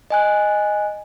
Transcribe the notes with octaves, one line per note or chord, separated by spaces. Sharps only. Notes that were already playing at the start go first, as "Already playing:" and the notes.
D#5 G#5 F#6